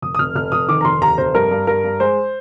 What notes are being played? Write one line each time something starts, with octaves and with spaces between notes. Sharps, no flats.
F1 D#6
D#6
F1 F6
F1 F6
F1 D#6
D#3 D6
A#5
F1 C6
D#2 A#5
F1 C5
G2 A#4
G2
G2 A#4
G2
G#3 C5